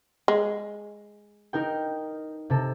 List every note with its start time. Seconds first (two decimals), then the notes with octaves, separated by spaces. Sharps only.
0.28 G#3
1.53 D#4 A#4 G5
2.50 C3 A4